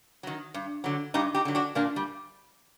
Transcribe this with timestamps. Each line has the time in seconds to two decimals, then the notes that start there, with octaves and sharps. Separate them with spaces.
0.23 D#3 F#3
0.54 G2
0.84 D3 F#3
1.14 G2 D#4 G4
1.34 D#4 G4
1.45 D3 F#3
1.55 D4 F#4
1.75 A#2 A#3 D4
1.96 G3